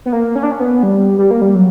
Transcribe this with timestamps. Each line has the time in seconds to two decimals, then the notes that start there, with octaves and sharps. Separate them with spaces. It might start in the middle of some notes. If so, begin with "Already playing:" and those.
0.06 B3
0.13 A#3
0.36 C#4
0.43 D4
0.51 C#4
0.60 B3
0.83 G3
1.18 G3
1.31 A#3
1.42 G3
1.55 F#3